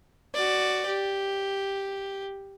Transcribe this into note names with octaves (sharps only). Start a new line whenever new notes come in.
F#4 D5
G4